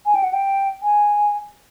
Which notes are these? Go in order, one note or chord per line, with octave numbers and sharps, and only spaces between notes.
G#5
G5
F#5
G5
G#5